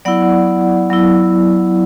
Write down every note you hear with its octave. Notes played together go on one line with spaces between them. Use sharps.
F#3 B3 E4 D5 F#5
F#3 B3 E4